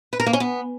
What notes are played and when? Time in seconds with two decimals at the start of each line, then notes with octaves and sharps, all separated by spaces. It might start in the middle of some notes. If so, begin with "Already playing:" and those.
0.13 B4
0.20 A#4
0.26 A#3
0.33 C#4
0.40 B3